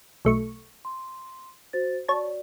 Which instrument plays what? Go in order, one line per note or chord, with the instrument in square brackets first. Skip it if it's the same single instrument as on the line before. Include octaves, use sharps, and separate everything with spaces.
[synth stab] B1 A3 C#6
[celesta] C6
F#4 C5 A6
[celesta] F#4 D5 [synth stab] C#5 A5